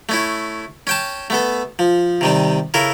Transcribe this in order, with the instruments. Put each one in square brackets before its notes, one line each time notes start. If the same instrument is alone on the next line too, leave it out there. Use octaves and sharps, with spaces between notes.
[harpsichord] A3 C#4 E4
C#4 G5 A5
A3 B3 A4
F3
C3 D#3 G3
C#3 E4 A4 A#4